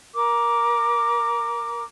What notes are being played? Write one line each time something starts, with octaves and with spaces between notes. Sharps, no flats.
A#4 D6